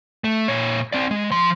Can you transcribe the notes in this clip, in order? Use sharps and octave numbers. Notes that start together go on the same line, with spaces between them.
A3
A#2 C#5
C4 D5
G#3
F3 C6